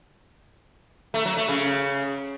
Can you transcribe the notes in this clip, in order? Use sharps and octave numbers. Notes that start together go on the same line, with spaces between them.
A3
F#3
A3
C#3